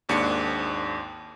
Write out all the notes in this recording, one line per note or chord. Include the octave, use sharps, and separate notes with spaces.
G#1 D#2 G#2 D4 C#7